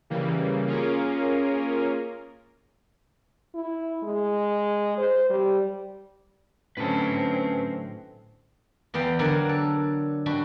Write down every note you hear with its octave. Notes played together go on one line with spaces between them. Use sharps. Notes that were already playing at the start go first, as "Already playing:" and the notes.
C#3 E3 G3 A#3
A#3 C#4 F4 G#4 A#4
E4
G#3
C5
G3
A2 D3 F#3 C4 C#4 B4 A5
E2 B3 D5 F5 G5
D3 F#3 A#3 A#4 D5 F#5
A4
G3 D4 F#4